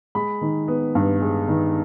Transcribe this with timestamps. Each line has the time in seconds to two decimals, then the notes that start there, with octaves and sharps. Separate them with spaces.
0.15 G#3 B5
0.41 D#3
0.68 B3
0.95 G2
1.22 G#3
1.48 D#3